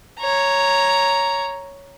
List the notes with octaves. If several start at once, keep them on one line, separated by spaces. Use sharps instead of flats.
C#5 A#5